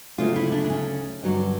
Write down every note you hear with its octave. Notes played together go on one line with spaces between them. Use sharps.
D2 C#3 F#3 A3 F4
E4
D4
D4
C#4
G2 D3 F#3